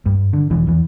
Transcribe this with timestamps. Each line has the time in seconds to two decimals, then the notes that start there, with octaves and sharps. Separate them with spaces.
0.06 G2
0.33 D3
0.50 E1 E3
0.67 E2 E3